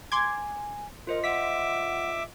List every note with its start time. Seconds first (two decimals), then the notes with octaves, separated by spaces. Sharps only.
0.12 G#5 C6 D6 G#6
1.07 F4 A#4 C5 D#5
1.24 E5 F#5 D6 B6